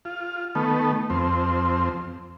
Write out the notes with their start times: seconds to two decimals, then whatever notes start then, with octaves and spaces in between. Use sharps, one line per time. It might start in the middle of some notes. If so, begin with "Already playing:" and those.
0.05 F4
0.55 D#3 A3 B3
1.10 F2 C4